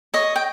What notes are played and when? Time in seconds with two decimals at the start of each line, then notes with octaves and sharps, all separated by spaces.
0.14 C#5 D#5
0.36 G5